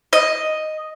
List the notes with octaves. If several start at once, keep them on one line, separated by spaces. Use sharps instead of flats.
D#5